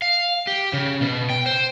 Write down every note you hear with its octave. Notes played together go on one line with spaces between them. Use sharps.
F5
G4
C#3
B2
G5
C5